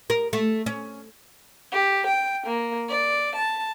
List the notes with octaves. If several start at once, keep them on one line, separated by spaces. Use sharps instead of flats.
A#4
A3
C#4
G4
G5
A#3
D5
A5